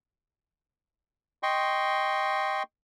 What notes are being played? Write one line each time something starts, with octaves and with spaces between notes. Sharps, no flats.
D#5 G5 C6 C#6